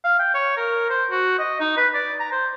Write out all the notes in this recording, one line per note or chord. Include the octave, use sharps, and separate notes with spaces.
F5
G5
C#5
A#4
C5
F#4
D#5
D#4
B4
D5
A#5
C5